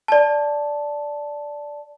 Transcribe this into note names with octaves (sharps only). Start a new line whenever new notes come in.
D5 A5